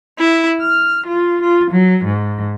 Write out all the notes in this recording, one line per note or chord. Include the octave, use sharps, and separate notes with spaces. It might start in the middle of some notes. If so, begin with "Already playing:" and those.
E4
F6
F4
F4
F#3
G#2